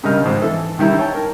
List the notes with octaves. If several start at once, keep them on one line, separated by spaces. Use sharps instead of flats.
G2 C#3 G3 A#4 D#5 F6
G#1 G#2 F3
E3 A4
G2 D#3 G3 E4 A#5
C#5 G5 A5
A#4